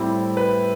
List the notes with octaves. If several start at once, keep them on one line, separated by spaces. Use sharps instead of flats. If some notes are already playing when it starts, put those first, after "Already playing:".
Already playing: A2 G3 C4 E4
B4